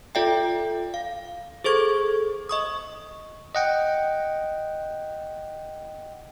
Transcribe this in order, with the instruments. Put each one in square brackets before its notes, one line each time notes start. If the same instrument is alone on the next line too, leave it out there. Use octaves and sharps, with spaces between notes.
[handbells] F4 A4 D5 E5 G5
F5
G#4 A4 C5 C#6 G#6
D#5 C#6 D#6
[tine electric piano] D#5 F#5 G5